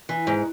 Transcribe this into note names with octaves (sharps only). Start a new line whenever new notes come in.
E3
G#2